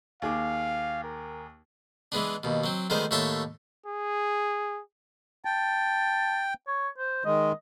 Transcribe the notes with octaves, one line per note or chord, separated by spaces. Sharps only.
D#2 G#4 F5 D6
A#4
E3 G#3 B3 D4
D#2 B2
F#3 C4
D2 D#3 G#3 B3 C5
D#2 A2 C#5 E5 A5 C6
G#4
G5 A5
C#5
C5
D#3 G#3 D#5